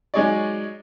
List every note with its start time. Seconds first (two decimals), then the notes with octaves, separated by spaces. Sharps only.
0.14 F#3 G#3 D#4 G#4 C#5 D5